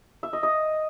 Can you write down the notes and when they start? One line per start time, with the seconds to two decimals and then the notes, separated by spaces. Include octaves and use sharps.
0.23 E5
0.33 D#5
0.43 D#5